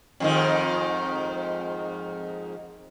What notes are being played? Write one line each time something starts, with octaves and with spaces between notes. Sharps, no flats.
F2 G#2 D#3